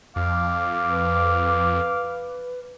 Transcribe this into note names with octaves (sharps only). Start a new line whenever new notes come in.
F2 F5 D6
B4